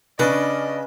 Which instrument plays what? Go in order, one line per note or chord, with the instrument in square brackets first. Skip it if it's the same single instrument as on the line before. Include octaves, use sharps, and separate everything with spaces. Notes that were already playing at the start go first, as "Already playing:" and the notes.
[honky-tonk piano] C#3 [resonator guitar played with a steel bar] C#4 D4 D5 [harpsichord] B4 [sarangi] D#5